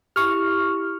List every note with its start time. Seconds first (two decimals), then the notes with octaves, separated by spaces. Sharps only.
0.16 E4 G4 C#6 F6